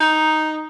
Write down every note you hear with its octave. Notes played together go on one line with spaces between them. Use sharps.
D#4